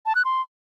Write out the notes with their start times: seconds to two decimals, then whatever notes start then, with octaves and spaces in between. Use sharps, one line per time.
0.06 A5
0.15 F#6
0.25 C6